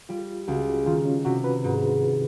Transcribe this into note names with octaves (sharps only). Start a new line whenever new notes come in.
G3 F4
C#2 F#4
D#3 F4
C#4
C3 F#4
B4
G#2